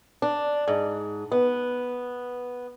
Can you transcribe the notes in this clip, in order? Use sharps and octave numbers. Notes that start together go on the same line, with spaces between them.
D4
G#2
B3